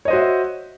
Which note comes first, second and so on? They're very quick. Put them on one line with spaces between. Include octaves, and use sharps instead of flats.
C#5 D#5 C5 F#4 E5